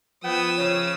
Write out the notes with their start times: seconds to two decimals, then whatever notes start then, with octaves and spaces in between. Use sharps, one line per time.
0.24 F3 B3 G5 D#6 E6
0.58 C#3 C#5